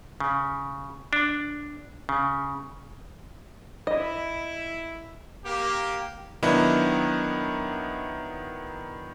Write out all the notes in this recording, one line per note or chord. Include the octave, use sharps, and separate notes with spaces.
C#3
D4
C#3
E4 D#5
A#3 G4
D#3 F#3 B3 D4 E4 D#5